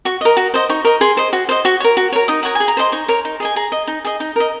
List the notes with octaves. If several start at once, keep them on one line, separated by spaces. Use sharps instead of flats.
F#4 C#6
A#4 D#5
F#4
C5 D#5
D#4 C#6
A#4 D#5
G#4 C6
C5 D#5
F#4
C5 D#5
F#4 C#6
A#4 C#5
F#4
A#4 C#5
D#4 D#6
A#4 C#5 F#5
G#4 G#5
A#5
C5 D#5 C6
D#4 C#6
A#4 C#5
D#4
G#4 D#5 G#5
G#4 A#5
D#5
D#4
G#4 D#5
D#4
A#4 D#5